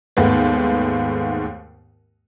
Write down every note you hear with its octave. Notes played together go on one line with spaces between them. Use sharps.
D#2 G#2 A3 B3